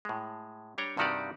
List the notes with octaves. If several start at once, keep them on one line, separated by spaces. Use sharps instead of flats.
A2 G#3
G3 D4 C#5 G5 A#5
G2 C3 D#3 F#4 G4 D5